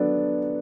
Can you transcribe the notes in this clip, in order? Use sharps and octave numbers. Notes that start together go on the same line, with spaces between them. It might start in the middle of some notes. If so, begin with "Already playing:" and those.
Already playing: F#3 B3 D4 A4